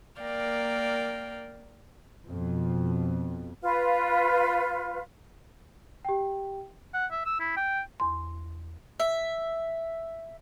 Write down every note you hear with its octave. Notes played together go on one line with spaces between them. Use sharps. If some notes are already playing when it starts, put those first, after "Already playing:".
A#3 A#4 D5 F5 G5
F2 B2
F4 B4
G4 G5
F#5
E5
E6
E4
G5
E2 C6
E5